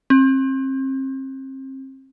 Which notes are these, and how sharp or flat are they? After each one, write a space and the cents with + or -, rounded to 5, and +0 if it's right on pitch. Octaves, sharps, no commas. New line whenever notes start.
C4 +35